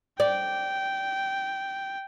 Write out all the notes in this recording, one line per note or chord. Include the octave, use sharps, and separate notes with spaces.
D5 G5